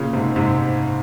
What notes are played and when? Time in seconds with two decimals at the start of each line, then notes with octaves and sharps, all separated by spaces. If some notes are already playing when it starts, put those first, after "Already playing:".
Already playing: A#2 C#3
0.13 G#2 C3
0.36 G#2 C3